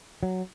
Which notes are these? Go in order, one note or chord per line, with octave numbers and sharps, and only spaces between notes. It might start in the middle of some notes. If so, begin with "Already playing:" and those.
F#3